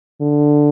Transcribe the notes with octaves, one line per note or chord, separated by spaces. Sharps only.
D3